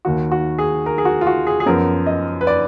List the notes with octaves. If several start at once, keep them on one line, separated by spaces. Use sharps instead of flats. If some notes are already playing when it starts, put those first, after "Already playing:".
D#2 D#3 A#3 F#4
F#4
G#4
A#4
G#4
F#4
F4
F#4
G#4
G#4
F#2 F3 B3 A#4
D#5
B4
D5